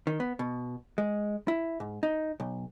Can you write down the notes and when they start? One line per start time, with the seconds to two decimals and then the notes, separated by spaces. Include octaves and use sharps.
0.07 D#3
0.20 B3
0.39 B2
0.98 G#3
1.48 E4
1.80 G#2
2.03 D#4
2.40 B1